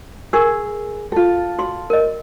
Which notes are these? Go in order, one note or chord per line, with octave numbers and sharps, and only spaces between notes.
G#4 A#4 C#6 E6
F4 A4
F#4 C6
A#4 D#5